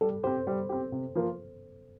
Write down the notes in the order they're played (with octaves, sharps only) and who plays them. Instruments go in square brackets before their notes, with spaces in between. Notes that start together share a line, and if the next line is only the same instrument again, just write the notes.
[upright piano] G3 [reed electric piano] A4
[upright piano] C4 G4 [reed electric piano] C5
[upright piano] G3
C4 G4
C3
F3 A#3 F4 A#4